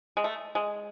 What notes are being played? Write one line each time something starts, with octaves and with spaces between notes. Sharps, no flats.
G#3
A3
G#3